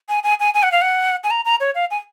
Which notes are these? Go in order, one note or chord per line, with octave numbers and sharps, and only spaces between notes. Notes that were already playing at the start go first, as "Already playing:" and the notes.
G#5
G#5
G#5
G#5
F#5
F5
F#5
G#5
A#5
A#5
C#5
F5
G#5